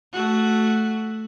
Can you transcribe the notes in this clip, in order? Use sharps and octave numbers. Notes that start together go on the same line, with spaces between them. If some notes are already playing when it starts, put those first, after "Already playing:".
A3 F#4